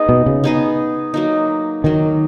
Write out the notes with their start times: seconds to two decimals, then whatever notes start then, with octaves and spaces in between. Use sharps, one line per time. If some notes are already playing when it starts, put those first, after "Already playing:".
Already playing: B3 D#4 G#4 D#5
0.09 B2
0.26 C#3
0.44 B3 D#4 G#4 D#5
1.14 F#3 A#3 D#4
1.84 D#3 F#3 A#3 D#4